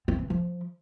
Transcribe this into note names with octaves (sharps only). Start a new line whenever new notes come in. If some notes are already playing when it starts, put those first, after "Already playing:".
C4
E3
F3